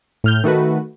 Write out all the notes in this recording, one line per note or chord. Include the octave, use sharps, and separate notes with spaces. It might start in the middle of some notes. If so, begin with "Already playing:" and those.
A2 F6 G6
D#3 A3 F#4 B4